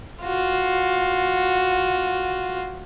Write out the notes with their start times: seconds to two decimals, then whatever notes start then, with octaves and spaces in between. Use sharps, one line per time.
0.23 F4 F#4